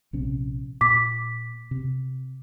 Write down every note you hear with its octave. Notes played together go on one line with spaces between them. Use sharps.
A#1 C3 C#4
A#2 D6 B6
C3